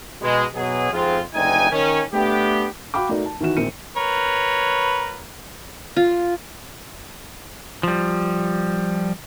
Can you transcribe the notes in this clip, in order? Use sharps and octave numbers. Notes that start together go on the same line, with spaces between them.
B2 G#3
B2 F#3 G#4
F2 G#2 G#3 C4 F4
F#1 D2 D#4 G5 G#5
D#3 C#4
A3 B3 D4 G4
F#4 F5 G5 B5 D6
A3 D#4 F#4 A#4 D5
A5
D#3 E3 E4 F#4 E7
A#1 C4 A#4 C#7 D#7
A#4 B4 C#5
F4
F3 G3